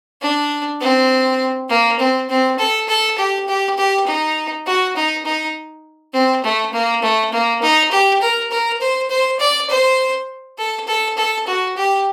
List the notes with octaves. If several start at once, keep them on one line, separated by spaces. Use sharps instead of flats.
D4
C4
A#3
C4
C4
A4
A4
G4
G4
G4
D#4
F#4
D#4
D#4
C4
A3
A#3
A3
A#3
D#4
G4
A#4
A#4
C5
C5
D5
C5
A4
A4
A4
F#4
G4